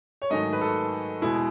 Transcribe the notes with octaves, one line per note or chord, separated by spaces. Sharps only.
C#5
G#2 D#3 F#3 A3 D#5
B4
A4
E2 B2 G#3 E4